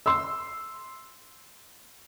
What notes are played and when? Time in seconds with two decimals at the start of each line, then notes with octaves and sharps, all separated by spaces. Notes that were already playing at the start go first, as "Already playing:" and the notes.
0.06 C6 E6